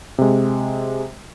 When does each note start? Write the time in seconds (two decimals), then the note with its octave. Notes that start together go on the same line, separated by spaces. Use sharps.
0.18 C3 G#3